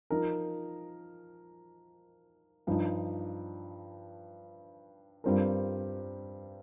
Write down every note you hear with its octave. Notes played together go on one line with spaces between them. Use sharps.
F3 D#4 A#4
G2 F3 D#4
G2 G3 C4 F4 A#4